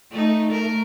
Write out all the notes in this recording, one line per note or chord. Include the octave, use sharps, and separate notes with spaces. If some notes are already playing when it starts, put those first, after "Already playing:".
A3 D#4
A3 A#4